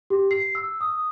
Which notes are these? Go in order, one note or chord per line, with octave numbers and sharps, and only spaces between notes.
G4
C7
E6
D#6